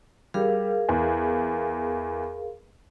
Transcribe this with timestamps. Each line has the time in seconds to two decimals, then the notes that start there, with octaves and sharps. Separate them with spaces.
0.34 G3 G#4 A#4 F5
0.89 E2